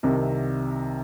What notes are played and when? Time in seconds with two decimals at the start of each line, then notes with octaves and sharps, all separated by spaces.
0.03 C2 C3 D#3